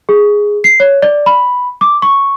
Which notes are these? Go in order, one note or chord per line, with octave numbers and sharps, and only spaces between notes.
G#4
C7
C#5
D5
B5
D6
C#6